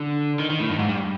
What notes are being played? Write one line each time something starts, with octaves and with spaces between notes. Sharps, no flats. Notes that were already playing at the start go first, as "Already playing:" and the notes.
Already playing: D3
D#3
D#3
A2
G2
G#2
G2